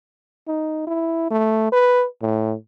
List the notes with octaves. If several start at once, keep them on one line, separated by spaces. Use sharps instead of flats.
D#4
E4
A3
B4
A2